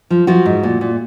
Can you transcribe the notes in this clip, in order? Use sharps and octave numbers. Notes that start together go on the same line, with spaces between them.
F3
F3 E4 F#4
G#2
A#2
A#2